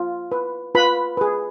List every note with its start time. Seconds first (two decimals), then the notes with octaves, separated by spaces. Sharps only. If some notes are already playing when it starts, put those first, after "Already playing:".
Already playing: F4
0.32 B4
0.75 F4 B4 B5
1.17 G#4 B4